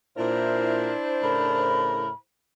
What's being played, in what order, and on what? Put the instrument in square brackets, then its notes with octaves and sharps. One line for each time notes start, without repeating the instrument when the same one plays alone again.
[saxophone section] A#2 A#4 [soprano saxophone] D4 [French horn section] E4 C5
[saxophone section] A2 C#3 A#4 [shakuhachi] B5